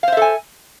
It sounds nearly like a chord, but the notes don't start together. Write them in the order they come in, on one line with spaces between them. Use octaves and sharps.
F5 C5 E5 A4 G#5